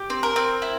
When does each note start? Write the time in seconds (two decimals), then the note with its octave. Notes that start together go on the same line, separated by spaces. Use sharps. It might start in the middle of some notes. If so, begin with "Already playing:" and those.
Already playing: G4
0.10 C4
0.23 A#4
0.36 C4
0.62 E4